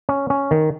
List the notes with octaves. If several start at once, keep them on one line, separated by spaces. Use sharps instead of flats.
C#4
C#4
D#3